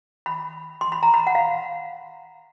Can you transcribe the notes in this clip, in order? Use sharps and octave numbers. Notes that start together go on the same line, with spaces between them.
B5
C6
B5
A#5
B5
F#5
F5